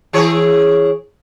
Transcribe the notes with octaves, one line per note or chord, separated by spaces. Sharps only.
E3 G#4 C#5